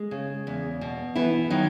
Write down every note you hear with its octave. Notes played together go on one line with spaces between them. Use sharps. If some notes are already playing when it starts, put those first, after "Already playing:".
Already playing: G#3
C#3
E2
B2
E3 B3 E4
D#3 F#3 D#4